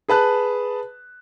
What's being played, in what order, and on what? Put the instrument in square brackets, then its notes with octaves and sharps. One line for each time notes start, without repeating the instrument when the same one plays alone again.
[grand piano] G#4 B4 A5 F#6